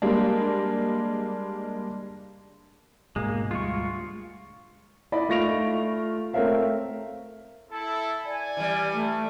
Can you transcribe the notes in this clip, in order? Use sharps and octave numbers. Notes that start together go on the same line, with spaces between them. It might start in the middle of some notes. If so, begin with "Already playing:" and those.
G3 G#3 A#3 D4
G#2 B2 G#3 A#3
D2 G3 G#3 F4 C#6
E4 D5 D#5 B5
A3 F4 C#6 A#6 D7 F7
A3 C4 A#4 C#5 E5 F5
E4 A4
D5 G#5
E3 G3
A3